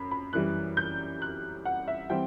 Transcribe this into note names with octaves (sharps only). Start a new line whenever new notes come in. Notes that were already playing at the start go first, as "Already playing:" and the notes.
Already playing: F#2 B5
B5
F#2 E3 G3 F#6
G6
F#6
F#5
E5
E3 G3 C4 G5